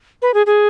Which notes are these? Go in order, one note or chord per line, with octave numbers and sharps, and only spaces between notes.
B4
G#4
G#4